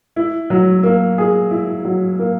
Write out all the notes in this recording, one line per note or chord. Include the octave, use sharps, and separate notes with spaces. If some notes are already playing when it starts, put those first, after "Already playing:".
E4
F#3
A#3
G#4
E4
F#3
A#3